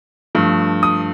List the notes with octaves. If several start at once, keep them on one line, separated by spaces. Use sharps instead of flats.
G2 F3 A3
D#6